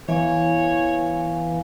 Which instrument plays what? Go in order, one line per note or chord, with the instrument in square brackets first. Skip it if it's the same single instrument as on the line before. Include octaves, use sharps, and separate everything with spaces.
[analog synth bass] E3 [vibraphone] B3 F5 G#5 [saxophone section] C#5